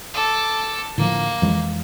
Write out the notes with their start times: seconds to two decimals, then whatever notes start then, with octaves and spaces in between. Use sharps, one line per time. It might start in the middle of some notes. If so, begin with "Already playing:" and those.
0.14 A4 D6
0.98 A2 D3 F3 A#3
1.42 F2 E3 G#3